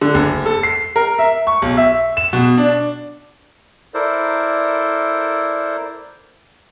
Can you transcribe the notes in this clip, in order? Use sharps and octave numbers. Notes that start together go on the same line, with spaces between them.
D3
F#1
A4
C7
A#4
E5
C#6
B1
E5
E7
B2
D4
E4 A4 A#4 C5 D5